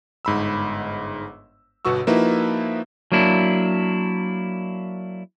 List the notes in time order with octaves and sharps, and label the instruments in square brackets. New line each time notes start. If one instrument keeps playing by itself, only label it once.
[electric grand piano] G1 G#2 B5 E6
G1 B2 B3 F#4 C#6 E6
F3 A#3 D#4 E4 F#4 B4
[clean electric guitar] F#3 A#3 D4 E4